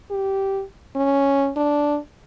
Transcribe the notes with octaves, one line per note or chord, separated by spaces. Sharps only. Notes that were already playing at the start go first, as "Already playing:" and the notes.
G4
C#4
D4